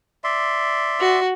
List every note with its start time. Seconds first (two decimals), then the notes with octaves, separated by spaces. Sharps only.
0.24 D5 E5 C6
1.00 F#4